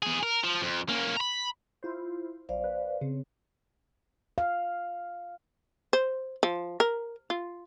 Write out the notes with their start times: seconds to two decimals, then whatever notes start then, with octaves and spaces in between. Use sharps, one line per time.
0.03 B3 G#4
0.23 A#4
0.44 F3
0.62 F2
0.89 A#3 C#4
1.17 A#5 B5
1.83 E4 F4 C5
2.49 B1 C5 D5 F5
2.64 B4
3.01 C#3 C4
4.38 F5
5.93 C5
6.43 F3
6.80 A#4
7.30 F4